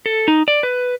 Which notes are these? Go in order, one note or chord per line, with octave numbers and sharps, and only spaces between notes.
A4
D#4
D5
B4